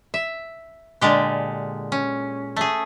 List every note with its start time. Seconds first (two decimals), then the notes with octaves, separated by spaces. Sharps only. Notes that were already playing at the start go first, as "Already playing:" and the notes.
0.14 E5
1.01 A#2 D3 G#3 G4
1.92 C#4
2.56 A3 G#4